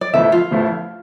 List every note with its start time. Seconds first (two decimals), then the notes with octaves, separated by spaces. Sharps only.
0.01 D5
0.14 A1 A2 F3 A3 E4 E5
0.32 F4
0.51 A1 A2 F3 A3 E4